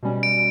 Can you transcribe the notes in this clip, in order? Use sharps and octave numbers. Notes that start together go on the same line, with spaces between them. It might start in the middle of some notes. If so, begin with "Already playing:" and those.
B2 G3 C#4
D7